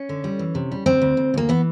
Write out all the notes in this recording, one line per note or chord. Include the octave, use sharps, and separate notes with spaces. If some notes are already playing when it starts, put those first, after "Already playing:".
Already playing: C#4
D3
G3
E3
C3
G3
D2 C4
D2
D2
D2 A#3
E3 B3